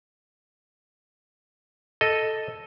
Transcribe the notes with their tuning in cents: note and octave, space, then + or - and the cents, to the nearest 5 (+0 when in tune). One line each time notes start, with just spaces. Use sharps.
A4 +0 D#5 +0